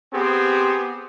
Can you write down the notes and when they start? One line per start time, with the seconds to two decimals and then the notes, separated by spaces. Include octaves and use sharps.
0.13 B3 C4 G4 G#4